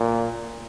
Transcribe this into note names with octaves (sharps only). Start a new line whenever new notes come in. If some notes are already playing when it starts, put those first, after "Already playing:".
Already playing: A#2